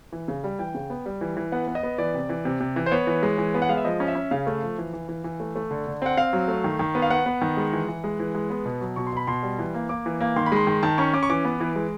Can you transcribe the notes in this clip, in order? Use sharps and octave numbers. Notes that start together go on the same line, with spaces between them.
E3
C#3
G3
E3 G5
C#3
B3
G3
E3
E3
B3 F#5
B3
D#5
B3
E3 D5
C3
E3
C3
C3
E3
C5
B3 C#5
E3
G#3
E3
B3
F#5
G#3 F5
E5
F3 D#5
C#4
E5
C#4
C#3 F5
A3
F3
E3
E3
E3
E3
A3
A3
D3
D3
C4 F#5
C4 F5
F#3
A3
D#3
D#3
B3
F5
B3 F#5
B3
D#3
G#3
E3
E3
G#3
E3
G#3
B3
B2
F#3
B2 C#6
C6
B2 B5
B2 C6
G3
E3
A#3
A#3 D6
E3
A#3
D#3 C6
B5
G#3 C6
D#3
D#3 A5
C#4 C#6
C#4 D6
C#6
E3 D6
B3
E3
G#3